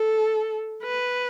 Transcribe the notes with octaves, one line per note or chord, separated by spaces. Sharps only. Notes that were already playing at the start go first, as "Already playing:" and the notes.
Already playing: A4
B4